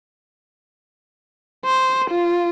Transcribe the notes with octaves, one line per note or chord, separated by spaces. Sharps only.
C5
F4